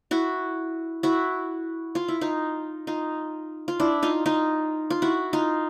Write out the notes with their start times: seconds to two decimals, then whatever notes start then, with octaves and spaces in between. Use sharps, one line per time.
0.11 E4 F#4
1.03 E4 F#4
1.95 F4
2.08 E4
2.21 D#4 F4
2.87 D#4 F4
3.68 F4
3.80 D4 E4
4.03 D#4 F4
4.26 D#4 F4
4.90 F4
5.02 E4 F#4
5.33 D#4 F4